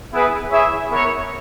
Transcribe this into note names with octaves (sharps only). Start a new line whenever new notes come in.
B3 E4 G#4 B4
E4 G#4 C#5 E5
B3 E4 A#4 C#5